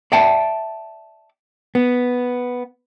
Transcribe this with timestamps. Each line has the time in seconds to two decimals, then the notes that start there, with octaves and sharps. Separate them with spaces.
0.12 D5 E5 G5 A5
1.75 B3